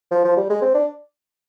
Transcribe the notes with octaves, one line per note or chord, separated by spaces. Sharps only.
F3
F3
G3
G#3
C4
D4